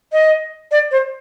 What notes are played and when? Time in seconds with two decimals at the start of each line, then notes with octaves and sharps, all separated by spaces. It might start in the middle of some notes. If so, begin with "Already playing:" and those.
0.12 D#5
0.71 D5
0.91 C5